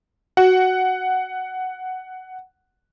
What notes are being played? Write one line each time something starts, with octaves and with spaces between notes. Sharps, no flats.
F#4 F#5